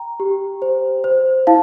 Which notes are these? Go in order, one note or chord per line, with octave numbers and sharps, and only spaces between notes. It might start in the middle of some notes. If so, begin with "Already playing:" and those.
Already playing: G5 A#5
G4
C5
C5
E4 F5 A5